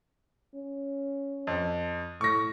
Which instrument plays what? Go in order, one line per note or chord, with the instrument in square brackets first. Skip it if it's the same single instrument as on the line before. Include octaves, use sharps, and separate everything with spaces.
[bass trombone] C#4
[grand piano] F2
[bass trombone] A2 [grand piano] C#6 A#6